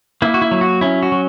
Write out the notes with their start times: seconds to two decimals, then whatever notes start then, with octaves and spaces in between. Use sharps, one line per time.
0.22 A#3 E4
0.34 F#4
0.42 E4
0.51 F#3
0.61 F#4
0.81 C#4 E4
1.03 F#4
1.12 F#3